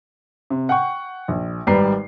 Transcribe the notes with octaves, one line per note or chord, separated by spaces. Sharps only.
C3
F#5 G5 C#6
A#1
G#1 G3 B4 D5 A#5 C7